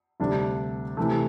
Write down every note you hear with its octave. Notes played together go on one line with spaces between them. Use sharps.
D2 C3 G3 D4
C3 E3 A3